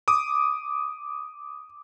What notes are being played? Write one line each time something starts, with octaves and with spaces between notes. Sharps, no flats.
D6 D#6